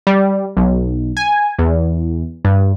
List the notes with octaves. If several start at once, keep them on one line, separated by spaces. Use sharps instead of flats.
G3
B1
G#5
E2
G2